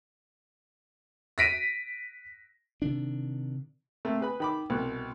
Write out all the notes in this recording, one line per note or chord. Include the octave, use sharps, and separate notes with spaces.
A#6 B6 D7 D#7
C3 D#3 D4
A3 A#3 C4
G#4 B4 B5
D#3 B5 D6
C2 B2 F#6